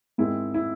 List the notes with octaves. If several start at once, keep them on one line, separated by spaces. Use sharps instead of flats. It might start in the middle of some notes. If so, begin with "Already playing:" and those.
G#2 D#3 G#3 C4 E4
E4